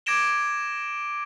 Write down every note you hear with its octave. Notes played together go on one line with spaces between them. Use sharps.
D6 G#6 A#6 D7 E7 G7